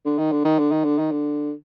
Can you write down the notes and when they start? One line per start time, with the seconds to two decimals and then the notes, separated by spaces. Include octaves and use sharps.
0.05 D3
0.18 D#3
0.32 D3
0.45 D#3
0.59 D3
0.72 D#3
0.85 D3
0.98 D#3
1.11 D3